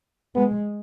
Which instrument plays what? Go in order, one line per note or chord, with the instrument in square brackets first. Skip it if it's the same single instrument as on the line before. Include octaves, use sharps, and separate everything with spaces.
[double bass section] G#3 [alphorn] B3